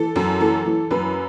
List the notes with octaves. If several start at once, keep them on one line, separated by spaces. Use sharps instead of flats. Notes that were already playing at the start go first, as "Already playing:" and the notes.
Already playing: E3 A4
F#2
E3 A4
E3
F#2 B4